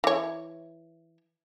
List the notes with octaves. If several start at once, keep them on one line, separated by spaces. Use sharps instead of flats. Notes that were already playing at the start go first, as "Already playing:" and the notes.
E3 C#5